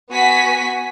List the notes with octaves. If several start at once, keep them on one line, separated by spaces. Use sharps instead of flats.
B3 F#4 G#5 B6